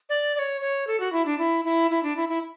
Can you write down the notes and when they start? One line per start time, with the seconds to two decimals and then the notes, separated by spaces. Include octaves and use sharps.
0.09 D5
0.35 D5
0.39 C#5
0.61 C#5
0.87 A4
1.00 F#4
1.13 E4
1.26 D4
1.39 E4
1.65 E4
1.91 E4
2.03 D4
2.17 E4
2.29 E4